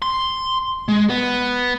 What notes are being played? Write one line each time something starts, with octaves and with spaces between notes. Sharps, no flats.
C6
G#3
B3